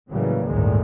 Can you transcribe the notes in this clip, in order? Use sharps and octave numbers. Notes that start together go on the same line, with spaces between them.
A2 C#3 E3 F#3 G3 A#3
G1 D2 A2 D#3 G#3